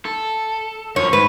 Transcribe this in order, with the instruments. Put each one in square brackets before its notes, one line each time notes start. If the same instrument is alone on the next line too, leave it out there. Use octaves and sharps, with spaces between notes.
[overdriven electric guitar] A4
[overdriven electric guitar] F#2 F3 [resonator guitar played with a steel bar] C#5
[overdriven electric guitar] G#2 [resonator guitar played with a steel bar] B4